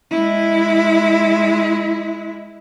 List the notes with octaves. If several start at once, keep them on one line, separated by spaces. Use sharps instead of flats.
G#3 E4